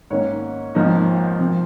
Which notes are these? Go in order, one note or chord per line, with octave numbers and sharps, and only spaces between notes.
G#2 D#3 A#3 C#4 C#5
G#1 G#2 F3 A#3 D#4
F3 C4